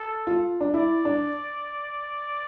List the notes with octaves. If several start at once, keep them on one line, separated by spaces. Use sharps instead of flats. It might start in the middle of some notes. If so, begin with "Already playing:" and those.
Already playing: A4
F4
D4
E4 D5
D4